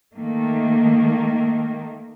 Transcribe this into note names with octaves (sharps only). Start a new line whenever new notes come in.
D#3 A3 A#3